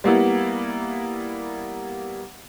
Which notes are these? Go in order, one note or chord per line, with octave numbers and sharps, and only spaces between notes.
G3 A#3 B3 E4